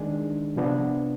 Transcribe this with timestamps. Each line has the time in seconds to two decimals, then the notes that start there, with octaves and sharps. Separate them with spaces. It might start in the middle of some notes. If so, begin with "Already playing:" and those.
Already playing: D#3 G#3 D4 G#4
0.56 C3 F3 B3 D4